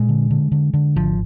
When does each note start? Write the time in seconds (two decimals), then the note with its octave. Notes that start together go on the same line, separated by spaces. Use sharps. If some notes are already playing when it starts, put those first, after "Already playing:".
Already playing: A#2 G#3
0.09 D3
0.31 D3
0.52 D3
0.73 D3
0.96 G#1 F3